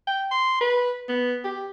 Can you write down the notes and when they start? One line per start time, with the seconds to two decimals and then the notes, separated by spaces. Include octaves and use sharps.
0.07 G5
0.31 C6
0.61 B4
1.09 B3
1.44 G4